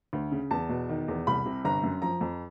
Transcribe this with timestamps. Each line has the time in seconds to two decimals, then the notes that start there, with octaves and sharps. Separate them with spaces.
0.13 D2
0.32 C#3
0.51 E2 A5
0.69 B2
0.89 D#3
1.08 E2
1.27 C2 B5
1.45 C3
1.65 G1 A#5
1.83 F#2
2.02 F3 A#5
2.21 F2